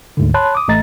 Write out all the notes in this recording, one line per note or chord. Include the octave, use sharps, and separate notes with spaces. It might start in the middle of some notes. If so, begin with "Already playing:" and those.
D2 G#2 D3
C#5 A5 B5 C6 F#6
D6 D#6
A1 A3 D#5 A#5 A6